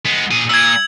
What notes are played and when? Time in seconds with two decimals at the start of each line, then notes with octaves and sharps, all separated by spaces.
0.06 G#3 B3
0.31 A#2 G#4
0.49 A#2 E6 G#6